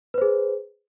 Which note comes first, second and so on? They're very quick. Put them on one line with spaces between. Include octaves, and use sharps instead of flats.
B4 C5 G#4